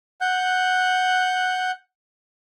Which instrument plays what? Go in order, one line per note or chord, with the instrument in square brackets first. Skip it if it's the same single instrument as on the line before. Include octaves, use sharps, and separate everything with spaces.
[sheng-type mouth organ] F#5 F#6 G6